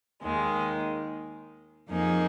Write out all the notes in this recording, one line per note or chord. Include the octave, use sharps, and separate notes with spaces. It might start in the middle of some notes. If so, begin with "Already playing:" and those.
D#2 D#3 G#3
F2 F3 A#3 D#4 G#4